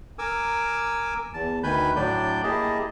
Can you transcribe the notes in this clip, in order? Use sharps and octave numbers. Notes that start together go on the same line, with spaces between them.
A#4 G#5 D6 E6
E2 A5
D2 D#3 B4 G#5 B5 G6
A2 F#3 D4 D5 G6
A#3 E4 G4 G#4 D#5 A5